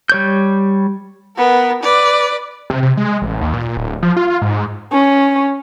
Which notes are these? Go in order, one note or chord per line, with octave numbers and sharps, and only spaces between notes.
G3 C#5 G6
B3 A#4
B4 D5
C3
C3
G#3
A1
D#2
A#2
D1
F3
F4
G#2
C#4